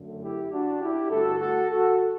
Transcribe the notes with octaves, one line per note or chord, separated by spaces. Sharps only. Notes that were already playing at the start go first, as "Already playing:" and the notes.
Already playing: F#2 D3 A3
E4 G4
D4 F#4
E4 G4
G2 D3 A3 F#4 A4
F#4 A4
F#4 A4